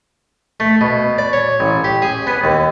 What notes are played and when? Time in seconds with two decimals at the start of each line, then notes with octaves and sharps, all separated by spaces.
0.60 A3
0.81 B2
1.18 D5
1.33 C#5
1.60 A1
1.84 G4
2.02 G#4
2.27 B3
2.44 D#2